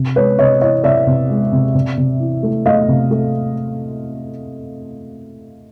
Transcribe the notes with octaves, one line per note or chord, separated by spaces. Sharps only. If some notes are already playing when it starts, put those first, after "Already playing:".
Already playing: C3
G#3 B4 C#5
C3 C#5 D#5
E3 C#5 D#5
C3 D5 E5
C3
G#3
C3
C3
C3
E3
A3
A3 D#5 F5
C3
A3